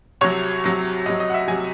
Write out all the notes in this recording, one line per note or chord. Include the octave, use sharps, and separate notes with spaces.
C2 C3 F#3 C#5
C2 C3 F#3
C2 C3 F#3 D#5
D#5
F#5
E5
C3 F#3 G#5